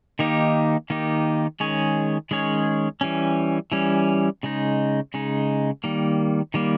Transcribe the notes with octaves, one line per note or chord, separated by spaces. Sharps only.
D#3 A#3 D#4 G4
D#3 A#3 D#4 G4
D#3 G#3 C#4 G#4 C#5
D#3 G#3 C#4 G#4 C#5
E3 G3 C#4
E3 G3 C#4
C#3 G#3 D#4
C#3 G#3 D#4
D#3 G3 A#3
D#3 G3 A#3